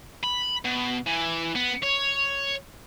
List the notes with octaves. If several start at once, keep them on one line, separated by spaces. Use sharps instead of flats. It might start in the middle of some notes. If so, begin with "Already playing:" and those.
B5
B2
E3
B3
C#5